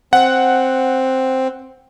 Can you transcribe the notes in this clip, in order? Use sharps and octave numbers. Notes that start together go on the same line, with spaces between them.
C4 F#5